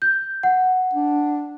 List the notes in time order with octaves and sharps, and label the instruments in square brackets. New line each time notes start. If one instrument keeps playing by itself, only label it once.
[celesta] G6
F#5
[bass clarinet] D4